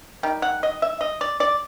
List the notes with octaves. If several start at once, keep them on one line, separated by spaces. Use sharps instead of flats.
D#3 G3
F#5
D#5
E5
D#5
D5
D5